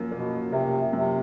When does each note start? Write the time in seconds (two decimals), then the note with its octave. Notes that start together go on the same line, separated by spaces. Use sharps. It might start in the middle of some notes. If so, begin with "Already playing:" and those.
Already playing: F#2 F3 A#3
0.11 B2 A#3
0.52 C3 A#3
0.92 F#2 C3